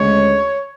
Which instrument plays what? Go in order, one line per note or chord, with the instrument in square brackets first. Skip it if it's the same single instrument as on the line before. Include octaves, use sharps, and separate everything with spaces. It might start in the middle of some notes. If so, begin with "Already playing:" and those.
Already playing: [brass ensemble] D2 C#3 G#3 [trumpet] C#5